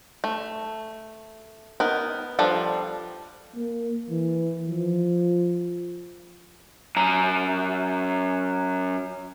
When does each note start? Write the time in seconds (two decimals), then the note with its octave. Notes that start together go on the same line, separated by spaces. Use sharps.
0.24 A3
1.80 B3 D#4 A#4
2.39 F3 G3 D4 A4
3.56 A#3
4.10 E3
4.68 F3
6.96 F#2 A#5